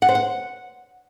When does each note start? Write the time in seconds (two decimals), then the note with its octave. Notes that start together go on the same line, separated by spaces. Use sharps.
0.02 F#5
0.09 C5
0.15 F#5